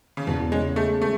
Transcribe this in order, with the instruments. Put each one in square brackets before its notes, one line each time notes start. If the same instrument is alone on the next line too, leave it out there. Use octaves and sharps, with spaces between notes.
[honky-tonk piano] C#3
[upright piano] E2 [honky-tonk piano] B2
[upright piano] C#3 [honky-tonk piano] G#3
[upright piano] G#3 [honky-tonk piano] A3
[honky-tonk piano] A3 [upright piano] B3